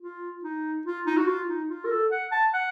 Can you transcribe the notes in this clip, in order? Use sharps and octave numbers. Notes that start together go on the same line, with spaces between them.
F4
D#4
F4
D#4
F#4
F4
D#4
F4
A#4
A4
F#5
A5
F#5